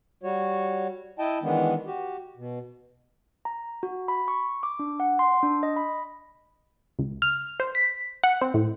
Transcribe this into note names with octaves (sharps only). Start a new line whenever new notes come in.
G3 F#4 C#5
E4 D#5 G5 A5
D#3 E3 G#3 B3 D4
F#4 G4
B2
A#5
F#4
B5
C#6
D6
D4
F#5
C6
D4
D#5
B5
C#2
F6
C5
B6
F#5
C4
A2